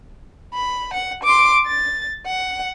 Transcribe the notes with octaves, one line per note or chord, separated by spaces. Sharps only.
B5
F#5
C6 D6
A6
F#5